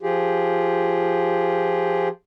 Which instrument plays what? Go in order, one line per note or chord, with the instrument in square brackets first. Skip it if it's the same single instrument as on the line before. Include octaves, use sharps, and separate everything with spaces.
[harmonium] F3 F4 G4 G#4